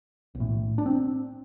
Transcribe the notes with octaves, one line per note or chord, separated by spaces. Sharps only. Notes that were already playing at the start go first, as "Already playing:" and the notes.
B1
A2
D4
C4